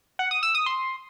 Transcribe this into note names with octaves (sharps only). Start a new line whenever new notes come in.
F#5
D#6
E6
D#6
C6